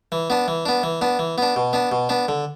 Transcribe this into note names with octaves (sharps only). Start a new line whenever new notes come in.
E3
B3 D4
E3
B3 D4
E3
B3 D4
E3
B3 D4
B2
B3 D4
B2
B3 D4
D3